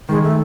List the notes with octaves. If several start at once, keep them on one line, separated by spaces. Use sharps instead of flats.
D#3 G#3
A3